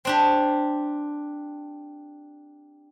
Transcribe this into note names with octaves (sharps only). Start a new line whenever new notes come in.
C4 D4 G4